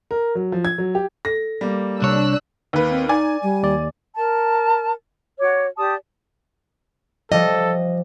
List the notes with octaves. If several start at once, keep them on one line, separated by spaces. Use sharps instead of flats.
A#4
F#3
F3
G#6
F#3
G4
A4 A#6
G3 A#3
C2 D4 C#5 E6 F#6
D#2 B4
C4
D#4 D5 G#5
G3
D#2 D5
A#4 A5
F#4 C#5 D6
G4 D5 A5 D#6
F3 G3 A4 D#5